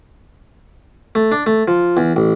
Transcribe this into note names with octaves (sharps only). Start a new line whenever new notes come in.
A3
D4
A3
F3
E2
A1